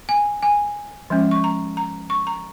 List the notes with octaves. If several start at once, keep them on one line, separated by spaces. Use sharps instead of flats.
G#5
G#5
F3 G#3 C#4
C#6
A#5
A#5
C#6
A#5